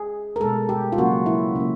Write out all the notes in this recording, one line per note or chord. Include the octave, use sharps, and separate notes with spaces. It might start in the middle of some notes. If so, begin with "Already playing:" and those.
Already playing: G#4
A#4
B2 G#3 A4
G4
F4
C#3 F#3 A#3 F#4
E4
C#3 F#3 A#3